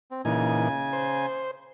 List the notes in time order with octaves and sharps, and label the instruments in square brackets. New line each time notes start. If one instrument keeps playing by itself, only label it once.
[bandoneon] C4
[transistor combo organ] A#2 E3 D#4 [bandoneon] C#3 G#5
[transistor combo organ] C5